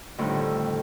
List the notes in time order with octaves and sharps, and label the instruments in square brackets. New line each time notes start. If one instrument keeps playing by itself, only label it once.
[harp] F2 A2 D3 D#3 G3 E6